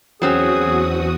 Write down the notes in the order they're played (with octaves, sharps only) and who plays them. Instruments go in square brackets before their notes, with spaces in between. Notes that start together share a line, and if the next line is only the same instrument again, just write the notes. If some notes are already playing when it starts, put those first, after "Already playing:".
[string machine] E2 F#4 D#6 [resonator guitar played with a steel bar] F#3 C4 C#4 [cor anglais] G#4